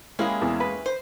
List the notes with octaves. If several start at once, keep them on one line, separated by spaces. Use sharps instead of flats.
G#3 A#3 C#4 E4 G4 G#4 F5
E2 E3
B4
C5